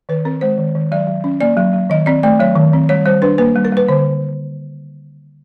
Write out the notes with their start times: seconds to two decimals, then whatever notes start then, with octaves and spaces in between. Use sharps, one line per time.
0.09 D#3 B4
0.25 C4 A#4
0.41 G#3 C5
0.58 D#3
0.75 D#3
0.92 F#3 D5
1.07 F#3
1.24 C#4
1.41 A#3 D5
1.57 F#3
1.73 F#3
1.90 D#3 D#5
2.06 C4 D5
2.23 A3 D5
2.40 F#3 C#5
2.56 D#3
2.73 C4
2.89 G3 C#5
3.05 G3 C5
3.22 D4 B4
3.38 A#3 B4
3.56 G3
3.65 A#4
3.72 G3 B4
3.88 D3 C5